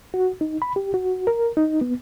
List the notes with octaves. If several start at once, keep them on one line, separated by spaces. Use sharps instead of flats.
F#4
D#4
B5
G4
F#4
A#4
D#4
B3